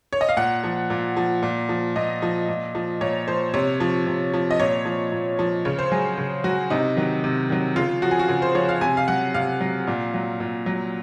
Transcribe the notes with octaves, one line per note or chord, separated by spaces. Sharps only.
C#5
D#5
F5
A#2 F#5
F3
A#2
F3
A#2
F3
A#2 D#5
F3
A#2
F3
A#2 C#5
F3 C5
C3 C#5
F3
C3
F3
D#5
A#2 C#5
F3
A#2
F3
C#3 C#5
C5
F#3 G#4
C#3
F#3 F#4
C3 D#4
D#3 F#3
C3
D#3 F#3
C#3 F4
F3 F#4
G#4
F#4
C#3 G#4
C5
F3 C#5
F5
C3 G#5
F5
F#3 F#5
C3 F5
F#3
A#2
F#3
A#2
F#3